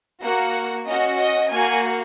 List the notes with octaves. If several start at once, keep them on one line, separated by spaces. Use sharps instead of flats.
A#3 F#4 F#5
C#4 F#4 D#5
D#5
A#3 F#4 G#5